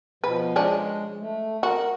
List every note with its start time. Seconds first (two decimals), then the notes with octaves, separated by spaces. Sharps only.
0.24 B2 F3 B4
0.56 F3 G#3 C#4 D4
1.20 A3
1.63 F#4 A#4